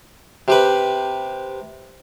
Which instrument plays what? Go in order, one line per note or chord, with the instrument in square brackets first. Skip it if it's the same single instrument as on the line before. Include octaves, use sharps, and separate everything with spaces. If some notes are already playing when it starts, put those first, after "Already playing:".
[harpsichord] C3 G4 B4